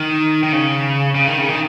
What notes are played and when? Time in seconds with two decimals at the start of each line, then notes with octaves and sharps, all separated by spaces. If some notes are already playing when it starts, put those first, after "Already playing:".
Already playing: D#3
0.43 D#3
0.53 C#3
1.15 C#3
1.27 D#3
1.38 C#3
1.49 D#3